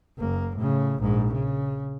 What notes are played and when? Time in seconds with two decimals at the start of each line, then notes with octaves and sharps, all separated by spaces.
0.18 F#1 A#3
0.56 A2 C#3
0.98 A#1 G#2
1.33 C#3